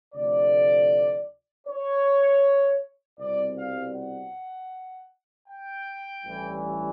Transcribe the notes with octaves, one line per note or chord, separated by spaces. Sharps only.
D2 C3 F3 A3 D5
C#5
C2 B2 G3 C4 D5
F5
F#5
G5
A1 G2 E3